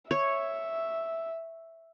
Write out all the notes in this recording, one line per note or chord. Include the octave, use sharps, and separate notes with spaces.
C#5 E5